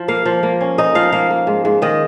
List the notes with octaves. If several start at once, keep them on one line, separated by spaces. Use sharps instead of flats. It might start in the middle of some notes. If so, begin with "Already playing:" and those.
Already playing: F3
A#3 F5
F3
A#3
C#4
D#4 D#5
F3 F5
A#3 F5
A#3
G#2
G#2
D#3 D#5